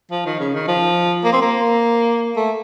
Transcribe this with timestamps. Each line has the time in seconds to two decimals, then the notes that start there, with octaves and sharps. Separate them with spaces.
0.11 F3
0.26 D#3
0.40 C#3
0.54 D#3
0.68 F3
1.24 A#3
1.33 C4
1.41 A#3
2.36 A3